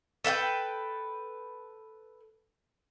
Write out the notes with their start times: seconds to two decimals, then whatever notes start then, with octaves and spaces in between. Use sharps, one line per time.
0.24 A4 B4 F5 G5